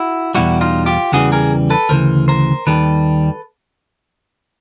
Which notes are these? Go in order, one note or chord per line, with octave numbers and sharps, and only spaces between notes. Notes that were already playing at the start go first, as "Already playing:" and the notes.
Already playing: E4 F#4
E2 B2 G3 E4 F#4
D#4 F4
F4 G4
E2 C#3 E3 G3 F#4 G#4
G#4 A#4
A4 B4
D2 C#3 E3 A#4 C5
A#4 C5
D#2 D#3 G3 A4 B4